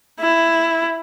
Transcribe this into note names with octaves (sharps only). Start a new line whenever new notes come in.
E4